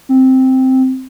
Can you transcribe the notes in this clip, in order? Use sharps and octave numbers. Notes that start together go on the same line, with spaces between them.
C4